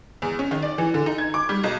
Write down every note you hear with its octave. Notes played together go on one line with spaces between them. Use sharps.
E2
C#4
D#3
D5
E3
D3
D#4
G#6
D6
G3
B1